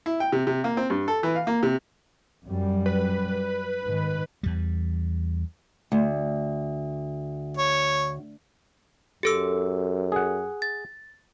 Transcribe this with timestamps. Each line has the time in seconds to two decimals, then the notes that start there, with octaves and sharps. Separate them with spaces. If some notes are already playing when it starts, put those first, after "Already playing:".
0.06 E4
0.20 G5
0.32 C3
0.47 C3
0.64 A#3
0.77 C4
0.90 G2
1.08 A4
1.23 E3
1.35 F5
1.47 A#3
1.63 C3
2.46 F#2 G3
2.86 B4
3.81 G#2 D#3
4.43 E2 G3
5.92 D2
7.57 C#5
9.23 F#2 G4 A4 E6
10.12 G#4 F#5
10.62 A6